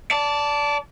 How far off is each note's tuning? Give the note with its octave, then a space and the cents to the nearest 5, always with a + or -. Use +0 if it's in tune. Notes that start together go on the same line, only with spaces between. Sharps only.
D5 -20 A5 +0